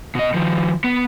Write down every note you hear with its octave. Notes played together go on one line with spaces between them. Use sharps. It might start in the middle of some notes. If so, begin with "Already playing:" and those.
B2 D#5
D#3 F3
B3